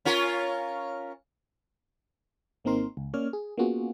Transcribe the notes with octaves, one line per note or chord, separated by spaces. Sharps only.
C#4 F4 A#4
G#1 A#3 C4 D#4 A#4 C6
C#2
A#3 C#4 C#5 D5 F6
G#4
A#3 B3 C#4 F4 F#4 G#4